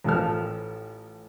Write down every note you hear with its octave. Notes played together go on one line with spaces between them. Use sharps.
A1 F3 A4 F6